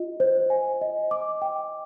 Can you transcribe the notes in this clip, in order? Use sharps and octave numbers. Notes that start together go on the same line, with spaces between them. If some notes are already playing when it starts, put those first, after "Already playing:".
Already playing: F4 D#5
C5
G#5
D#5
D6
G5